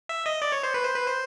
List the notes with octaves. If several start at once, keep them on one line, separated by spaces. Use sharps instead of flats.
E5
D#5
D5
C#5
C5
B4
C5
B4
C5